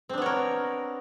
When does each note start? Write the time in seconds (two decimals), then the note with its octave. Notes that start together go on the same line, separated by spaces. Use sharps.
0.09 C4
0.14 D4
0.18 B3
0.22 C#5
0.26 A#4